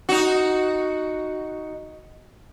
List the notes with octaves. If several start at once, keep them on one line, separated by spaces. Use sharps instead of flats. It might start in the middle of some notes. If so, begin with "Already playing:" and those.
D#4 F#4